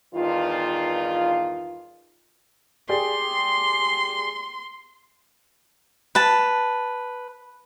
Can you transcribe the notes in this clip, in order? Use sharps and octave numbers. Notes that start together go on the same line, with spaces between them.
E2 G2 D#3 F4
G4 G#4 D5 C6
B4 A5